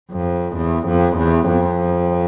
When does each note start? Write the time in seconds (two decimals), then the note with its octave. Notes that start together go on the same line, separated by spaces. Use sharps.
0.12 F2
0.57 E2
0.88 F2
1.18 E2
1.48 F2